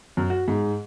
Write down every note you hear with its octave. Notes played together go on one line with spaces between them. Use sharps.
F#2
F#4
G#2